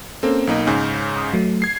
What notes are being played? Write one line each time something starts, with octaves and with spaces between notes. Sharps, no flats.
A#3 C4 C#4 A4
B1 A#3 D#4
G#2 C#3 G#5
D#6
F#3 A3
G#6 C7